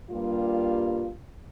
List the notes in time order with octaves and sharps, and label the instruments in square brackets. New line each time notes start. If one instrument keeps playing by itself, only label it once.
[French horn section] G2 G3 A#3 F4